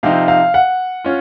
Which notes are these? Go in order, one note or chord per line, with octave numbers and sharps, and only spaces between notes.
C3 F3 C4 D#4 F5
F5
F#5
C#4 F4